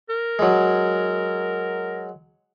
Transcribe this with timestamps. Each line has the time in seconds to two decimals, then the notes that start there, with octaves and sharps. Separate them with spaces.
0.10 A#4
0.39 F#3 G#3